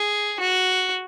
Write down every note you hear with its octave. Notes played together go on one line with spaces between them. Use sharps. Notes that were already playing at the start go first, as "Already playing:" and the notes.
Already playing: G#4
F#4